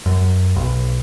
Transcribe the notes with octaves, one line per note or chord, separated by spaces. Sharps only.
F#2
B1